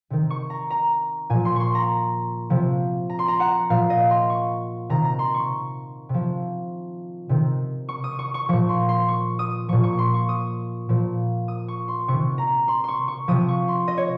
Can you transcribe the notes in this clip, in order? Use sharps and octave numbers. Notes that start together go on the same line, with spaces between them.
C3 D#3
C#6
A#5
A#5
A#2 F3 G#5
C6
C6 C#6
A#5
C3 F3
A#5
C6
A#5
F#5
A#2 F3 F5
D#5
C6
C#6
C3 D#3 A#5
A#5
C6
C#6
C3 F3
C3 D#3
C#6
D#6
C#6
C#6
A#2 F3 C#6
C6
C6
C#6
D#6
A#2 F3 C#6
C#6
C6
C#6
D#6
A#2 F3
D#6
C#6
C6
C3 D#3 C#6
A#5
C6
C6 C#6
C#6
C3 F3 D#6
C#6
C6
D#5
C#5